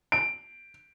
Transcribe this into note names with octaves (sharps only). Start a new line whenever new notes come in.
D7